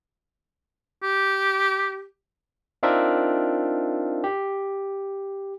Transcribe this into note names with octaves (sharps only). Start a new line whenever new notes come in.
G4
C4 D4 D#4 F4 A#4 E5
G4